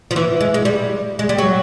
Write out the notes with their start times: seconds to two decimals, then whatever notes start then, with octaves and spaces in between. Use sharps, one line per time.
0.11 F3
0.16 E3
0.41 G#3
0.54 G#3
0.65 G3
1.19 G#3
1.29 G3
1.38 F#3